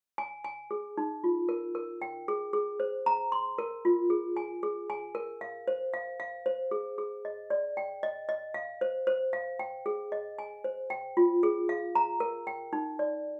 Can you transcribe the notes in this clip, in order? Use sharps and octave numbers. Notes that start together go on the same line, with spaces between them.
G#5
G#5
G#4
D#4
F4
A#4
A#4
G5
G#4
G#4
C5
A#5
C6
A#4
F4
G#4
G#5
G#4
G#5
A#4
F5
C5
F5
F5
C5
G#4
G#4
D#5
D5
G5
D#5
D#5
F5
C5
C5
F5
G5
G#4
D#5
G#5
C5
G5
F4
G#4
F5
A#5
A#4
G5
D#4
D5